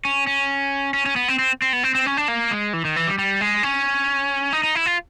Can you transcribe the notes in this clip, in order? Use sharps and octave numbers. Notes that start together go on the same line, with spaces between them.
C#4
C#4
C#4
C#4
B3
C4
C4
C4
B3
C4
C4
C#4
D4
A#3
G#3
E3
D#3
E3
G3
G3
G#3
C#4
D#4
D#4
E4
F4